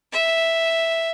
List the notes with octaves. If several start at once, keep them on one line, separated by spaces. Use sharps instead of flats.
E5